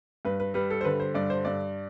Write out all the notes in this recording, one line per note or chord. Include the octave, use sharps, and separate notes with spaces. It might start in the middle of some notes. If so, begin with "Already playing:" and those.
G2 B4
B4
G3 B4
A4
C5
D3 B4
C5
G2 D5
C5
G2 D5